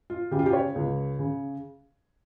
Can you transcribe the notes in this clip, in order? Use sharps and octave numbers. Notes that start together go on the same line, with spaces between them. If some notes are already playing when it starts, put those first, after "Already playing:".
F4
C#3 G4
F4
G4
C#5
C#2
C#3